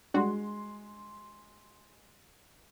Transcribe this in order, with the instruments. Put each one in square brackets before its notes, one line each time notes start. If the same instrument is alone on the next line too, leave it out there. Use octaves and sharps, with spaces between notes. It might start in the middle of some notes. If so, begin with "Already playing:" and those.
[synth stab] G3 D4 F#4 [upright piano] G#3 C6